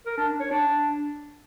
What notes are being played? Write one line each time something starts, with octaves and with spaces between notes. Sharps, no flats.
A#4
D4
D4
C#5
D4